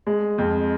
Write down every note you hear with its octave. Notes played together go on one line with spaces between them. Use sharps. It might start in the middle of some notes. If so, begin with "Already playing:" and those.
G#3
F2